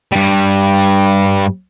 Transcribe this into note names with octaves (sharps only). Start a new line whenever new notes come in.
G2 G3